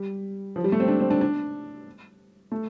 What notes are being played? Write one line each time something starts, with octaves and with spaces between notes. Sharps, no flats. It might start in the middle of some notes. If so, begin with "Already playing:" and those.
Already playing: G3
F3
G3
A3
C4
D4
C4
D4
D4
A3